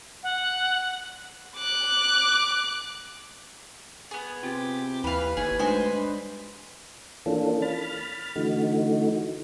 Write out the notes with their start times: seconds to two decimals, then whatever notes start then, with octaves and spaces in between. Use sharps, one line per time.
0.23 F#5
1.57 D6 F#6
4.11 B3 G#4
4.43 C3 F4 G4
5.04 D#2 E3 B4 F5 B5
5.37 G1 D#2 G#4
5.59 D2 G#3 C5 D#5 G#5
5.93 G2
7.26 E3 A#3 C#4 D4 F4 A4
7.62 B5 F6 A6
8.36 D3 E3 A3 D#4 F#4